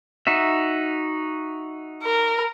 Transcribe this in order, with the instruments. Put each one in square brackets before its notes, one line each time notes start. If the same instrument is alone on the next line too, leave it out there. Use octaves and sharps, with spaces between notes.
[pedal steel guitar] D#4 F#4 E5
[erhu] A#4